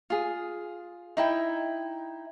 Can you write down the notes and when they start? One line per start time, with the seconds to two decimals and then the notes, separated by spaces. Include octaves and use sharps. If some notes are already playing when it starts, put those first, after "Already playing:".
0.10 F4 G#4
1.17 D#4 E4 G5